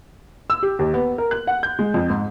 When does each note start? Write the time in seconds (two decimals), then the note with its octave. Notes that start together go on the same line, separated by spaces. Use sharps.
0.50 E6
0.63 G4
0.79 D#2
0.94 B3
1.18 A#4
1.31 F#6
1.47 F#5
1.63 G6
1.79 G#3
1.94 F2
2.10 G#2